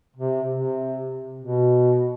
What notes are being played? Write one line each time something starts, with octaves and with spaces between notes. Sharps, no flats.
C3
C3
B2